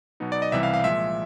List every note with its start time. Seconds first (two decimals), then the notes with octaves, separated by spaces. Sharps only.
0.20 B2 F#3 B3 D#4
0.32 D5
0.42 D#5
0.52 C2 C3 E3 G3 E5
0.63 F5
0.74 F5
0.84 A#2 F3 G#3 E5